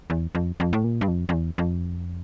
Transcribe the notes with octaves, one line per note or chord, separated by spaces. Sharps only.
E2
F2
F2
A2
A#2
G2
F2
F2
E2
F2